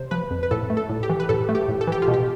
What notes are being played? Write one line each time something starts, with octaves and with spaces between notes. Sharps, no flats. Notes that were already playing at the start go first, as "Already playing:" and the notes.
Already playing: C3 C5
F3 B4
F2
B4
A2 A4
A3
A4
A2
G4
E3
B4
A2 A4
A3
G4
A2
A4
E3 G4
F4
B2
G4